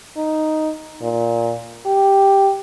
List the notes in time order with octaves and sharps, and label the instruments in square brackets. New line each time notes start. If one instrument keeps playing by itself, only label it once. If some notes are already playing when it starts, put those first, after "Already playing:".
[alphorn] D#4
A#2
G4